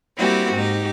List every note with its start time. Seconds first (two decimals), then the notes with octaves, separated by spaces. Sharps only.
0.16 G3 A#3 C4 E4 F#4 G4
0.53 G#2 D#4 G4